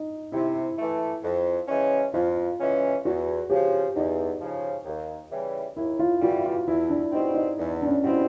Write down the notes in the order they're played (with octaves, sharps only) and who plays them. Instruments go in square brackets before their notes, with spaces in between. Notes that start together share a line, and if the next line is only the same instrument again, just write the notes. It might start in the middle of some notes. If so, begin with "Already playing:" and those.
Already playing: [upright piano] D#4
[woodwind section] C3 [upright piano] E4
[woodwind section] E3 A3
F2
C#3 E3 G#3 C#4
[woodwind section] F2 [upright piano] F4
[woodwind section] C#3 E3 G#3 C#4
[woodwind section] E2 [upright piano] F#4
[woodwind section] C#3 F3 [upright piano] G4
[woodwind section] E2 [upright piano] D#4
[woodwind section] C#3 F3
D#2
C#3 E3 G3
[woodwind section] D#2 [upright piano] E4
[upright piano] F4
[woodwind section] C#3 E3 G3 [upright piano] F#4
[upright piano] F4
[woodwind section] E2 [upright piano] E4
[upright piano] D4
[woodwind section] B2 G3 C4 [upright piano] D#4
[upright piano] D#4
[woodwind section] E2
[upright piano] D4
C#4
[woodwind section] B2 G3 C4 [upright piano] E4